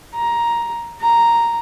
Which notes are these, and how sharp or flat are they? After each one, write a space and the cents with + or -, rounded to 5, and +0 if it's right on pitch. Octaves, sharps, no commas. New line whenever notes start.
A#5 +10
A#5 +0